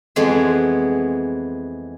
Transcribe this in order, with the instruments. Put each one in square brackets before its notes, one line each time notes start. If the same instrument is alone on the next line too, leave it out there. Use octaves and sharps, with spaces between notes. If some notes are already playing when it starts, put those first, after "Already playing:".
[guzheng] F2 E3 G#3 B3 G#4 C5